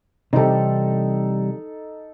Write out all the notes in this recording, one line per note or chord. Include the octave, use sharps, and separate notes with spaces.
C3 E3 G3 D#4 A4